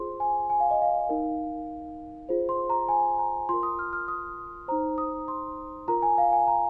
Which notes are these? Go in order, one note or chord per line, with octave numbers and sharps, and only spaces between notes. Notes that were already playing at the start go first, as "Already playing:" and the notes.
Already playing: F4 G#4 C5 C6
G#5
G#5
F5
D#5
F5
D#4 A#4
F4 G#4 C5
C6
A#5
G#5
A#5
F4 A#4 C6
D#6
F6
F6
D#6
D#4 C5 A#5
D#6
C6
F4 A#4 A#5
G#5
F5
G#5
A#5